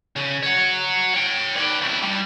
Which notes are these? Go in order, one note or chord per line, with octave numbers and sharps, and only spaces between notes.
C#3
C#5 F#5
C#5 G5
B4 D5
C#2 E4
G2 G3